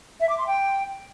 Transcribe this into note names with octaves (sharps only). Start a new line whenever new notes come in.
E5
D6
C6
G5